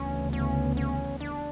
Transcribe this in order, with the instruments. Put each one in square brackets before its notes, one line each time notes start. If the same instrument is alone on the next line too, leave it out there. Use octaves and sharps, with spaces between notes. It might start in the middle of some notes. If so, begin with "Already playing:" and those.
Already playing: [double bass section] D2 C#3 E3 B3 [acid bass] C#4
[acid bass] C#4
C#4
D4